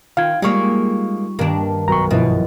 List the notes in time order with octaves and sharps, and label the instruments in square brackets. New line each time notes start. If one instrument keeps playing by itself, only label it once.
[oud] D#3 [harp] D#4 F4 G5 [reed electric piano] F5 G#6
[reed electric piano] G3 C#6 [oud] G#3 A#3 C#5
[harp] G2 D#3 [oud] A#3 D4
[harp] B1 F#2 [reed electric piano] A#5 C#6
[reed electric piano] G2 F3 E4 [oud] B2 [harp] B4 D#5 A6